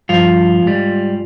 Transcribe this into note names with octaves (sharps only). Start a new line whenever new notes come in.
G2 F3 F4
G#2 G3